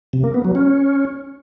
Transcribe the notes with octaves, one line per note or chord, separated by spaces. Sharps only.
C3
A#3
B3
F#3
C#4